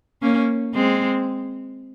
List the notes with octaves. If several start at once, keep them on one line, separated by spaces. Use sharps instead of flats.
A#3 C#4
G#3 C4